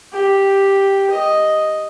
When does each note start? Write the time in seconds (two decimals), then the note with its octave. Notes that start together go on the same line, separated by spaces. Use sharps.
0.13 G4
1.10 D#5